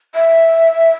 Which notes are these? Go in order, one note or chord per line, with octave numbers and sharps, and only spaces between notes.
E5